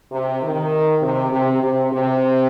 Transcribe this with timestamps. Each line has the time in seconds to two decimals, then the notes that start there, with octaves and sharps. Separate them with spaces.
0.11 C3
0.42 D#3
1.02 C3
1.31 C3
1.62 C3
1.91 C3